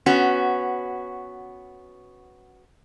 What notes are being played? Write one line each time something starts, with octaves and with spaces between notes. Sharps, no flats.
B3 C#4 F#4